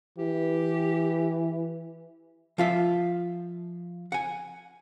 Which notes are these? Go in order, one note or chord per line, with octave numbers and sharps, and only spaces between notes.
E3 G4
F3 F4 E5
F#5 G#5